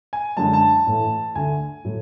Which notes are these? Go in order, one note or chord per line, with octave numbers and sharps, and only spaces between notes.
G#5
F#2 D3 G#3 A5
A5
A2 E3 A3
D2 D3 A3 G#5
A2 F#3 A3